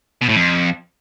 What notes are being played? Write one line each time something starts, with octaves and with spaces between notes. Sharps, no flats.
B2
A2
F2